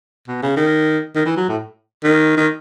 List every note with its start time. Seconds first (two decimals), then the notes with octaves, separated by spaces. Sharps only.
0.28 B2
0.43 C#3
0.57 D#3
1.16 D#3
1.26 E3
1.37 F#3
1.49 A2
2.04 D#3
2.37 D#3